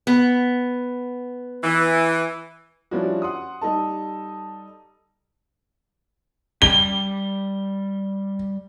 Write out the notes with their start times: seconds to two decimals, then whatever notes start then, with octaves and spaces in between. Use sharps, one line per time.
0.07 B3
1.64 E3
2.91 F3 G3 C#4 D4 E4 F#4
3.22 F#5 C6 D#6
3.62 G3 D#4 A4 A5
6.62 G3 G5 G7